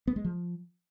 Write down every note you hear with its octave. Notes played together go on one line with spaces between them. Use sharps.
B3
G#3
F3